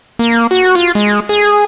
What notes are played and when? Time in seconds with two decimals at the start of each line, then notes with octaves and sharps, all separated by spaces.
0.19 A#3
0.51 F#4
0.75 F4
0.95 G#3
1.29 G#4